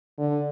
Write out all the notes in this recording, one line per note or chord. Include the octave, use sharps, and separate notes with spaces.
D3